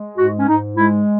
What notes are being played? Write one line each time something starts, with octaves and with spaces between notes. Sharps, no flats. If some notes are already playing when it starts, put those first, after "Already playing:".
Already playing: G#3
G#2 F#4
C#4
G#2 D#4
G#3 E4